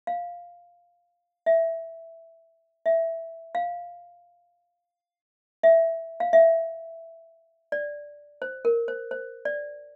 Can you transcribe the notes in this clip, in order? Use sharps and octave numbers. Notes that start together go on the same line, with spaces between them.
F5
E5
E5
F5
E5
F5
E5
D5
C5
A#4
C5
C5
D5